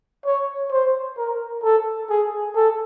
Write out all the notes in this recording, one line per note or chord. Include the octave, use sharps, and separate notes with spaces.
C#5
C5
A#4
A4
G#4
A4